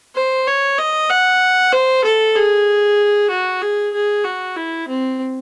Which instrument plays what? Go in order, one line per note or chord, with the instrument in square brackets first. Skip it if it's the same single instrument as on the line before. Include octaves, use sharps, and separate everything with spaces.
[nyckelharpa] C5
C#5
D#5
F#5
C5
A4
G#4
F#4
G#4
G#4
F#4
E4
C4